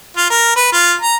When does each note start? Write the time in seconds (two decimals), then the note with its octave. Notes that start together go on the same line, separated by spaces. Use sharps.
0.17 F4
0.30 A#4
0.56 B4
0.72 F4
1.01 A#5